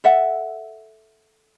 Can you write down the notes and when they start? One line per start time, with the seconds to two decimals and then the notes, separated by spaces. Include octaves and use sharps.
0.04 A4 E5 F#5